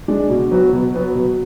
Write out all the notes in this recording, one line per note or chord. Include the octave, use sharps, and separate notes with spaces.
G#3 D4
B2
F#3 B3 F#4
B2
F#3 B3 F#4
B2